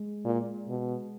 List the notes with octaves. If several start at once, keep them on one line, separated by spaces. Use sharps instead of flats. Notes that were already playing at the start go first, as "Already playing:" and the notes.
Already playing: G#3
A#2
B2